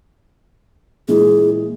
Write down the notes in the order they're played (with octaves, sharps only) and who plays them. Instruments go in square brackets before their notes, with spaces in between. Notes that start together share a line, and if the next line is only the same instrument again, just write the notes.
[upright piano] A#2 E3 G#3 [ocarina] G#4